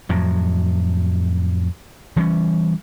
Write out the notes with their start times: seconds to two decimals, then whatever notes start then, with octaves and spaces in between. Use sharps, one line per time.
0.09 F2 A2 F#3
2.16 E3 G3 C#4